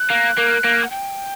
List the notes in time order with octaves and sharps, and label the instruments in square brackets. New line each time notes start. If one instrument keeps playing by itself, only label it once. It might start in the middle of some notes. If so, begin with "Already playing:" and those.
Already playing: [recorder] F#6
[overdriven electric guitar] A#3
A#3
A#3
[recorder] F#5
G5